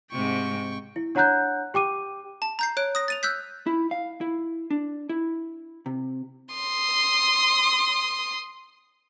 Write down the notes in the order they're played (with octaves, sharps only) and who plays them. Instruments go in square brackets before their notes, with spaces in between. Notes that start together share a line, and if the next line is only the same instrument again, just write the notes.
[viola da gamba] G#2 C3 [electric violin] G5 C#6
[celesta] E4
D4 C#5 F#5 A#5 F#6 G6
G4 G5 D6 D#7
[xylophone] A5
A#5 G6 C7
C#5 F#6 D7
D#6 A#6
A6 D#7 F7
E6 F#6 G6 B6
[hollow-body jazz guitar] E4
F5
E4
D4
E4
C3
[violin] C6 D#6